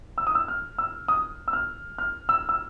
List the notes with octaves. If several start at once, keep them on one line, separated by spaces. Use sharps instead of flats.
E6
D#6
E6
F6
E6
D#6
E6
F6
F6
E6
E6